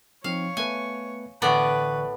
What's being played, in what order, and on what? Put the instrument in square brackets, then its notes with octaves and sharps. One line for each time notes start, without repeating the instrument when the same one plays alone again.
[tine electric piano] F3 C4 D#4 [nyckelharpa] C#5 [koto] F5
[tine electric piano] A3 B3 B4 [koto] G#5
[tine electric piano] A1 D3 C#6 [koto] A2 B3 D5 [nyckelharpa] B4